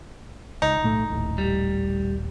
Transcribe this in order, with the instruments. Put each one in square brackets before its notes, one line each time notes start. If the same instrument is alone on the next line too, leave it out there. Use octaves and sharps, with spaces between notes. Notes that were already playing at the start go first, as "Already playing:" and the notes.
[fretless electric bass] C#2 [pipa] D#4
[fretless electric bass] B1 A2 A3
D#1 A#1 A2
[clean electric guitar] G3